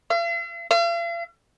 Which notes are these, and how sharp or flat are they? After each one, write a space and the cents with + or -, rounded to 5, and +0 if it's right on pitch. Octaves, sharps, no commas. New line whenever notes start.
F5 -45
F5 -45